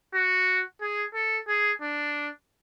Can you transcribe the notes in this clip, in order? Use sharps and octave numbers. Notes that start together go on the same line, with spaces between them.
F#4
G#4
A4
G#4
D4